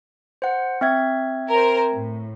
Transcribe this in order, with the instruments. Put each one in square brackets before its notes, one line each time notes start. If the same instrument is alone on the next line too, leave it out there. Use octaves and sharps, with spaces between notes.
[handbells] C5 F#5
C4 E5 G#6
[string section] A#4 C5
A2